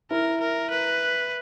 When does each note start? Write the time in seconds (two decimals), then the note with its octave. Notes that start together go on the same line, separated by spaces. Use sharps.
0.11 E4 A#4
0.40 A#4
0.70 B4